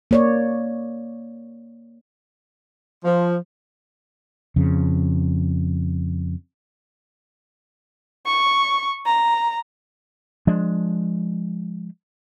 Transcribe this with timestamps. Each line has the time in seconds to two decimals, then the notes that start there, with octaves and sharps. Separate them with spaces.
0.11 A#3 C#5 D5
3.04 F3
4.56 F2 C#3
8.26 C#6
9.06 A#5
10.47 F3 G#3 D4